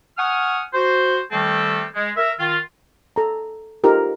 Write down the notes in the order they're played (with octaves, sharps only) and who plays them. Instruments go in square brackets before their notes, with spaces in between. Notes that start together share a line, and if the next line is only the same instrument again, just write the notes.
[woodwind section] F#5 G#5 C#6 D#6 F6
F#4 C5
D#3 G3 A3 C4 G4 A4
G#3
A#4 E5
D#3 F4
[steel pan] A4 A#5
D#4 F4 G4 A4 A#4 C5